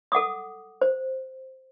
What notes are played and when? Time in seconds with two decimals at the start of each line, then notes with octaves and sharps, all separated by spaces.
0.12 A4 F#5 D6 D#6
0.81 C5